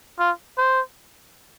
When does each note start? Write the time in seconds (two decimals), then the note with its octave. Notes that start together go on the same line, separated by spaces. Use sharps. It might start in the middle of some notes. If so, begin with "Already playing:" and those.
0.19 F4
0.58 C5